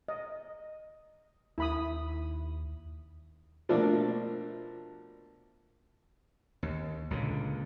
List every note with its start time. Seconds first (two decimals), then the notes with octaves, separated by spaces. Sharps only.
0.08 D#5
1.58 D#2 E4 B5 D#6
3.69 B2 F3 A3 A#3 D4
6.63 D#2
7.11 C#2 A#2 D3